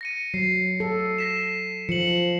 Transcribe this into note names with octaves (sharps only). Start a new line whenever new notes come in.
A#6 C#7 D#7
F#3 C7
A4
A#6 B6 E7
F3 C#7 F#7